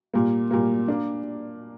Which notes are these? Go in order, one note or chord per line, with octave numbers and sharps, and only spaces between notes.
A#2 G3 A#3
A#2 G3 A#3
A#3 D4